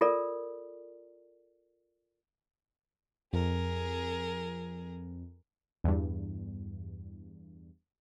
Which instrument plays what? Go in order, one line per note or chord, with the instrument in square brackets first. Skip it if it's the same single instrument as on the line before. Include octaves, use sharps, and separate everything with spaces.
[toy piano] F4 A4 A#4 D5
[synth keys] F2 [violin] G#4 A#4
[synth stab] E2 G2